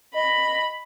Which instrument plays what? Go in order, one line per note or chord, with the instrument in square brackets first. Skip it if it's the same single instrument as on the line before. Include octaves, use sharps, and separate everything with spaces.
[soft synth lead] D#5 [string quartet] B5